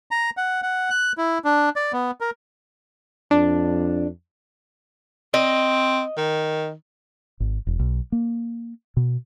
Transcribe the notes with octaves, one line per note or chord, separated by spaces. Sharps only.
A#5
F#5
F#5
F#6
E4
D4
D5
B3
A#4
F2 D4
C4 D#5
D#3
G#1
E1
B1
A#3
B2